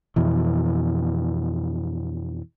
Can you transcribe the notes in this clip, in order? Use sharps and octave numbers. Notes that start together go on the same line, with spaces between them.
F2 B2 E3